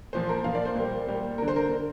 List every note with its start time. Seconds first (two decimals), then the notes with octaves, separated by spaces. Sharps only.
0.13 A#2 F3 A#3 C5
0.29 A#4
0.44 A#2 F3 A#3 F5
0.55 D5
0.65 C5
0.75 A#2 G3 A#3
1.07 A#2 G3 A#3
1.38 D3 A#3 A#4
1.48 C5
1.56 A#4
1.69 D3 A#3